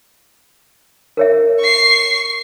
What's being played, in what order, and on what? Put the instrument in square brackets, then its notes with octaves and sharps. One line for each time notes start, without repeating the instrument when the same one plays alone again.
[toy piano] A#4 C#5 E5
[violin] C#6 C7